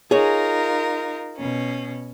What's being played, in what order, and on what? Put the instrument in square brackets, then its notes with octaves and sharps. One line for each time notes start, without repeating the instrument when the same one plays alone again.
[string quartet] D#4 F4 A#4 [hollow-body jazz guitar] G#4 C#5
[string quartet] B2 C#4